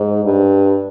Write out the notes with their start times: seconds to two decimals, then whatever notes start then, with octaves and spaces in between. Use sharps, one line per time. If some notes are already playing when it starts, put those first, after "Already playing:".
Already playing: G#2
0.25 G2